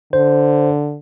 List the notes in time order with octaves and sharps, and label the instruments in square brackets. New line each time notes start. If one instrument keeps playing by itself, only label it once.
[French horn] D3 [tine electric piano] C5